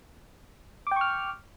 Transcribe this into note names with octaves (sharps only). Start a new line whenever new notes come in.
G5 C#6 D6 F6